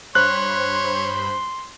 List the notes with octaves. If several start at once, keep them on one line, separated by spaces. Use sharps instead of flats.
G2 C5 C#5 B5 C6 F#6